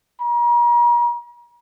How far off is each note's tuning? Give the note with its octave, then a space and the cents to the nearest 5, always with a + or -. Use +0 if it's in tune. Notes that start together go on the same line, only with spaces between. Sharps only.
A#5 +40